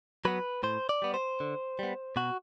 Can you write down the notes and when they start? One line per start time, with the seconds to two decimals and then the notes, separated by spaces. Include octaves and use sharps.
0.25 F#3 B3 B4
0.63 A2 C5
0.89 D5
1.02 G3 B3
1.14 C5
1.40 D3
1.79 G3 B3
2.16 B2 F#4